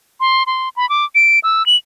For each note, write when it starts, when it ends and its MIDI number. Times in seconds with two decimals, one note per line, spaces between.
0.20 0.43 84
0.47 0.69 84
0.76 0.88 83
0.89 1.05 86
1.15 1.39 98
1.44 1.65 88
1.66 1.76 102